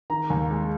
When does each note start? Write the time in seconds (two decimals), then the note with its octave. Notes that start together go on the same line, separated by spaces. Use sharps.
0.10 D#3 A#5
0.30 D#2
0.51 G#3